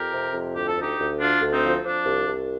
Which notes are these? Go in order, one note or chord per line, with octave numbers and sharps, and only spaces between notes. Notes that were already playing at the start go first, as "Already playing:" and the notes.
Already playing: F2 G4 A#4
C3
F2
D2 G4
A4
D2
D#4 G4
D2
D3 D4 F4
D2
C4 D#4
F3
F3 D4
C2
C2